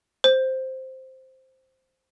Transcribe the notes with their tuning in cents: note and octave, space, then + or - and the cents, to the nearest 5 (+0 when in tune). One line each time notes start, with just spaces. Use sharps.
C5 +0